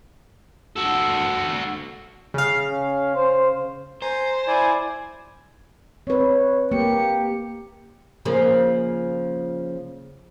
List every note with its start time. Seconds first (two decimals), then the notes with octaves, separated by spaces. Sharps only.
0.76 F#4 A4
2.34 C#3 F5
2.69 C#4
3.15 C5
4.02 C5 G#5 A#5
4.47 E4 D5 G#5
6.07 C4 B4 C#5
6.72 A#3 G4 C#7
8.25 C#3 F3 A#3